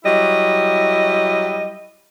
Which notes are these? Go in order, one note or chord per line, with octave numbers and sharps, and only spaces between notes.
F#3 G3 E4 D#5